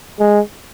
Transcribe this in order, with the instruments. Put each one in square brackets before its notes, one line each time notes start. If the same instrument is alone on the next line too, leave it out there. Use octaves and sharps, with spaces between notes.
[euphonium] G#3